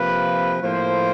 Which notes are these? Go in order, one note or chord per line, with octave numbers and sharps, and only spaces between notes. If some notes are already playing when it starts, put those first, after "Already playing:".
Already playing: C3 F3 A#3 B4
A2 F3 A#3 C5